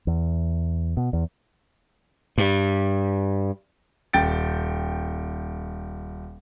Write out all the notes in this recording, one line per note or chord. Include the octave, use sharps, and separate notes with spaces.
E2
B2
E2
G2
D#1 G5 A6 D7